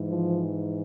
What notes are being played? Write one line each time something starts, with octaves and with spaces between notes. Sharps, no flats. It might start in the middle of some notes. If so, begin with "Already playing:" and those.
Already playing: G#2 E3
F3